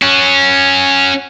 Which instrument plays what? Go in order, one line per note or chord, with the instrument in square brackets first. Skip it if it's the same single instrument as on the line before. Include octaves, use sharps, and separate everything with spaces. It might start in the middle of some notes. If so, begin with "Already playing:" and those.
[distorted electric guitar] C#4 F#4